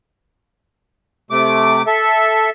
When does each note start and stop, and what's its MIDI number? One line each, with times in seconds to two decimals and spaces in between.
1.31 1.82 48
1.31 1.82 57
1.31 1.82 86
1.87 2.50 69
1.87 2.50 76